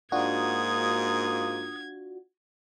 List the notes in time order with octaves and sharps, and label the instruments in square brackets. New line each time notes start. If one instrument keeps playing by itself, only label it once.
[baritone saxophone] G#2 [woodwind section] A#3 D#6 [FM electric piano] D4 F4 F#4 [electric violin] G#6